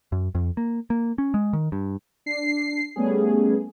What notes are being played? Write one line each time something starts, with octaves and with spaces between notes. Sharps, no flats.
F#2
F2
A#3
A#3
C#4
G#3
D#3
G2
D4 C7
G3 A3 B3 C#4 G#4